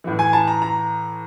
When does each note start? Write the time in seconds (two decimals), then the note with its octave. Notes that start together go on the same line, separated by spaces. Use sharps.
0.04 A2 E3
0.19 G#5
0.33 A5
0.48 A#5
0.62 A#5